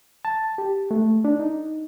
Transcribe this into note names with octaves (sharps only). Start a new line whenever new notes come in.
A5
G4
A3
D4
D#4